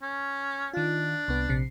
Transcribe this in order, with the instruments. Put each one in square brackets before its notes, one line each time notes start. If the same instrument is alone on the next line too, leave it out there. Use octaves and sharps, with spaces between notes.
[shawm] C#4
[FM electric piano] D#3 F4 [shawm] D4
[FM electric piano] C2 B3
A#1 C3 C7